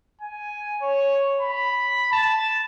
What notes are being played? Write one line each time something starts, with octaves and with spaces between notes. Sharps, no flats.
G#5
C#5
B5
A5